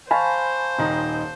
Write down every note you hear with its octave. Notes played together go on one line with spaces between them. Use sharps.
C5 F5 G#5 A5 B5 C#6
D#1 D#3 D#4